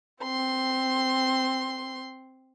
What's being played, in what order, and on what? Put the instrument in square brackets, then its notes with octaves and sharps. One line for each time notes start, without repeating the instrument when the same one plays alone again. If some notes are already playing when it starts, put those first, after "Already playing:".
[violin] C4 C6